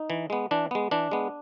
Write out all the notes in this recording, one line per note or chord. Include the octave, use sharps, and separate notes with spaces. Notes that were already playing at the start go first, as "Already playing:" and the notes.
Already playing: D#4
E3
G#3 B3
E3 D4
G#3 B3
E3 D4
G#3 B3